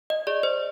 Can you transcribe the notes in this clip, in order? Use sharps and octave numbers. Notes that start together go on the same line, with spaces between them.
D#5
G#4 D5
C5